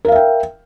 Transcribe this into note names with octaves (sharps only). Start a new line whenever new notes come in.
A#4 E5 F5 G5